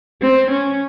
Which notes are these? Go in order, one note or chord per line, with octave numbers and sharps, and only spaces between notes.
C4
C#4